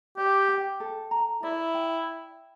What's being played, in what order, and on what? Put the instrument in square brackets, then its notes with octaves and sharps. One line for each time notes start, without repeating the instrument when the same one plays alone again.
[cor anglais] G4 [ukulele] D5
[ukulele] G5
A4
A#5
[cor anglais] E4 [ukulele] D5
[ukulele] G5